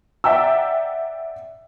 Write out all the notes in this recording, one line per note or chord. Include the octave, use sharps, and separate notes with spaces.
D5 E5 F#5 G5 A#5 E6